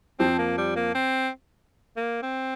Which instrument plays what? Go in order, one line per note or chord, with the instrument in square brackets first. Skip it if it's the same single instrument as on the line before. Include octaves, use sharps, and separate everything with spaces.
[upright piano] F2 F3 [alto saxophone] C4
[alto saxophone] A#3
G3
A#3
C4
A#3
C4